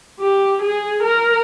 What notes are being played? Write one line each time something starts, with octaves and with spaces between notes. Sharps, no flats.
G4
G#4
A#4